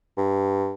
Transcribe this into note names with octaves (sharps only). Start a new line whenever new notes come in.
G2